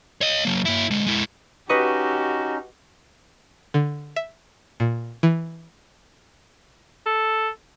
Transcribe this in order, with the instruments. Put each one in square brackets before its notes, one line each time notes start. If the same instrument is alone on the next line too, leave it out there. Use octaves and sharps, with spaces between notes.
[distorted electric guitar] C#5 D#5
F#3 A#3
A#3 E4
D3 G#3
G#3 E4
[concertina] C#4 D#4 [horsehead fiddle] F#4 G4 [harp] B4 D#5 C#6
[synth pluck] D3
E5
A#2
E3
[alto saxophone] A4